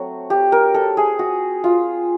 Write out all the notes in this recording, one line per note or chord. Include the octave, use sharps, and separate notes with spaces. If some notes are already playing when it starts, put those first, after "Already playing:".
Already playing: F#3 A3 C4 F#4
G4
A#4
A4
G#4
F#4
F4